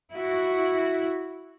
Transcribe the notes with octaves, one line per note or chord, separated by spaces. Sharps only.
E4 F#4